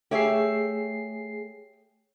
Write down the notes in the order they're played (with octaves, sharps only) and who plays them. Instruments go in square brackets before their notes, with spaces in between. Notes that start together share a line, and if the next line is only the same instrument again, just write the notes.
[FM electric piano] A3 G#4 C7 [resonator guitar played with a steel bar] G4 C#5 E5